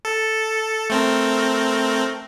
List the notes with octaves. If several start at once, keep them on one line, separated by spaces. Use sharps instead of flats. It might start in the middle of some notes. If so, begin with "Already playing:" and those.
A4
A3 C4 A#4